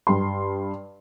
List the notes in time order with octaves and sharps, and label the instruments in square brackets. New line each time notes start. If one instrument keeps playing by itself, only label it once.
[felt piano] G2 C6